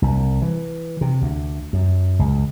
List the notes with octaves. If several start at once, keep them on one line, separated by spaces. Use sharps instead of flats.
C2
E3
C3
D2
F#2
C#2